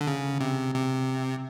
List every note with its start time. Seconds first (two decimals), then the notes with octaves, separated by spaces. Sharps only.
0.01 D3
0.07 C#3
0.41 C3
0.75 C3